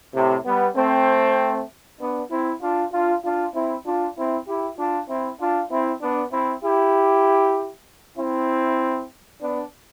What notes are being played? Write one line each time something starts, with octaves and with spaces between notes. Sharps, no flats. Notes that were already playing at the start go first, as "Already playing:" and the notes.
A2 C3
G3 B3
A3 C4
B3 D4
C4 E4
D4 F4
D4 F4
D4 F4
C4 E4
D4 F4
C4 E4
E4 G4
D4 F4
C4 E4
D4 F4
C4 E4
B3 D4
C4 E4
E4 G4
C4 E4
B3 D4